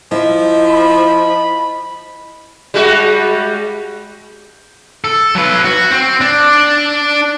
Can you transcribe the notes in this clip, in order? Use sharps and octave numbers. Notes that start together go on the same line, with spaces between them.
F3 E4 D#5
B5
G3 G#3 F#4
A4
F#3 B4
F#4
C4
D4